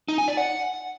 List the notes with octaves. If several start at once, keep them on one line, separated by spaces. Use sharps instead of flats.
D#4
G#5
D5
F#5